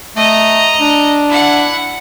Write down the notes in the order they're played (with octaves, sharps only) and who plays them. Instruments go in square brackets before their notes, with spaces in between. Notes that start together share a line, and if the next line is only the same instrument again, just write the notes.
[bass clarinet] A3 [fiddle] D#5 A#5
[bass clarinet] D4
[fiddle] E4 F#5